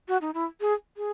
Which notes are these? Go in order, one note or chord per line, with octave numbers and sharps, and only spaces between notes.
F#4
D#4
E4
G#4
G#4